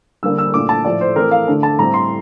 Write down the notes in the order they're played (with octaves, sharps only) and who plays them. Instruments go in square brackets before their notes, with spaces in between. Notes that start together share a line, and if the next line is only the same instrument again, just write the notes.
[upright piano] D3 G3 A#3 D4 E6
E6
A#2 A3 D4 D6
A5
A2 F3 A3 D5
C5
E3 A3 C4 A#4
F5
D3 A3 D4
A5
A2 G3 C4 A#5
C6